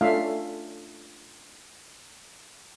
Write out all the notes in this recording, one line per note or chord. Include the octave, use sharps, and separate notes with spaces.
A3 C#4 D4 F4 E5 F5